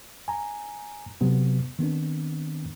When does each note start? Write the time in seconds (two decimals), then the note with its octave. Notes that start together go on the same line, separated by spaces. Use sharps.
0.28 G#5 A#5
1.21 C3 F#3 B3
1.79 D#3 B3 C4 D4